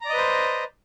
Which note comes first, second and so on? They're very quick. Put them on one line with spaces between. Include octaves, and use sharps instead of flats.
A#5 D5 D#5 B4 C5